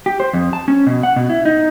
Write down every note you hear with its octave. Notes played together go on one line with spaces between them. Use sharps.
G4
C5
F2
A5
C#4
B2
F#5
B2
E4
D#4